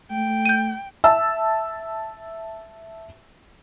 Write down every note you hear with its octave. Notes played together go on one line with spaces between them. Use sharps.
A3 G5
G6 D#7
E5 A5 E6